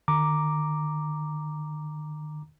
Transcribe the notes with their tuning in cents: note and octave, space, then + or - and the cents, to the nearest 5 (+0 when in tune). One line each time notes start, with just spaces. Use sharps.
D#3 -40 A#5 +0 D6 +0